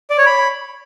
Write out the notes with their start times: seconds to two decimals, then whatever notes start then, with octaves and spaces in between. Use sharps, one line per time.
0.10 D5
0.18 C#5
0.26 B5